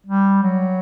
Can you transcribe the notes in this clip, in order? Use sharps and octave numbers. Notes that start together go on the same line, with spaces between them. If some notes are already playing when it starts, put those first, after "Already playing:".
G3
F#3